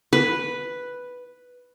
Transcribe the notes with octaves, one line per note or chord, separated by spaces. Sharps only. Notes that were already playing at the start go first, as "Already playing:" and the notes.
B4